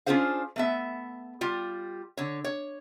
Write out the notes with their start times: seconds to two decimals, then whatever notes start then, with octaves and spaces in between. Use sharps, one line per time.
0.06 C#4 D4 F4 G#4 C5 F5
0.56 A3 B3 E5
1.41 G3 F4 G4
2.17 D3 C#5
2.44 C#5